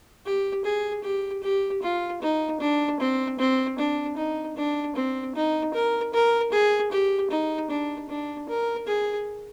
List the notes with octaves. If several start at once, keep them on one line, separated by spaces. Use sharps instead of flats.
G4
G#4
G4
G4
F4
D#4
D4
C4
C4
D4
D#4
D4
C4
D#4
A#4
A#4
G#4
G4
D#4
D4
D4
A#4
G#4